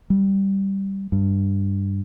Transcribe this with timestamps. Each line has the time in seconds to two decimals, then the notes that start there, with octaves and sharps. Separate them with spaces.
0.10 G3
1.12 G2